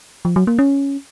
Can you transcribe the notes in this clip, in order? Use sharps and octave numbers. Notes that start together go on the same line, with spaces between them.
F3
F#3
A#3
C#4